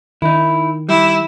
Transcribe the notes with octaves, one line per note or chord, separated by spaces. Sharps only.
D#3 D#4 E4
G3 E4